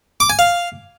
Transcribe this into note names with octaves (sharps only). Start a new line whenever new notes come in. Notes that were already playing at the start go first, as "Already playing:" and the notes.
D6
G#5
F5